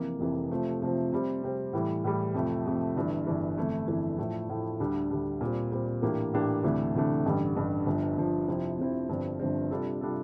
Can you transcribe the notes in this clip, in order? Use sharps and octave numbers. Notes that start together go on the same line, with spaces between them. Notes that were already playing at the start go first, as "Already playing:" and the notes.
Already playing: F1 F2 E3 A#3
F1 F2 E3 A#3
C3 F3 A3 C4 F4
C3 F3 A3 C4 F4
C3 G3 C4
C3 G3 C4
A2 E3 G3
A2 E3 G3
F2 C3 F3 A3
F2 C3 F3 A3
G1 G2 E3
G1 G2 E3
G1 F2 E3 A3 E4
G1 F2 E3 A3 E4
A2 F3 A3 E4
A2 F3 A3 E4
D2 D3 G3 D4
D2 D3 G3 D4
A#2 G3 C4
A#2 G3 C4
A2 E3 A#3 D4 G4
A2 E3 A#3 D4 G4
D2 C3 E3 A3 D4
D2 C3 E3 A3 D4
A1 G2 D3 G3
A1 G2 D3 G3
G1 G2 F3
G1 G2 F3
F2 C3 F3 C4 E4
F2 C3 F3 C4 E4
G1 G2 F3 C4
G1 G2 F3 C4
C3 G3 D4 F4 A4
C3 G3 D4 F4 A4